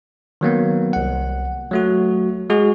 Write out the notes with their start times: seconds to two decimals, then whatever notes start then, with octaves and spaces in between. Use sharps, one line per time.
0.41 D#3 F#3 A#3 B3
0.93 C2 F#5
1.71 F#3 A3 F#4
2.50 G#3 F#4 G#4